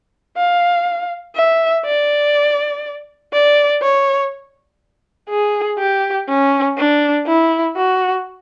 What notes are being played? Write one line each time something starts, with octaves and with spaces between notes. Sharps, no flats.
F5
E5
D5
D5
C#5
G#4
G4
C#4
D4
E4
F#4